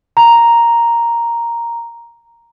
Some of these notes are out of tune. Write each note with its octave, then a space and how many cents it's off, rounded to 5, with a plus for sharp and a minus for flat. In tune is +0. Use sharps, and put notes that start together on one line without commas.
A#5 +0